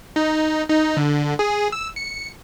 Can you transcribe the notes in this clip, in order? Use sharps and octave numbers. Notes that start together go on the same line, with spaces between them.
D#4
D#4
D3
G#4
E6
C#7